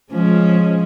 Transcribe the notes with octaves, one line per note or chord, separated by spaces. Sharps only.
F3 G#3 C#4